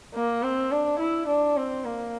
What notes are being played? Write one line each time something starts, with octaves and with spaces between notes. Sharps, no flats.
A#3
C4
D4
E4
D4
C4
A#3